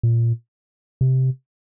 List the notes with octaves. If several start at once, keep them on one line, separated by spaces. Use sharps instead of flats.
A#2
C3